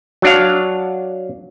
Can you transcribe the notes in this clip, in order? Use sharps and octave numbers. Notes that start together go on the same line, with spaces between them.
F#3 D4 F5